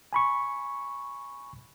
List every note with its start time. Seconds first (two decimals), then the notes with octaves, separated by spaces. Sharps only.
0.13 G#5 B5 C#6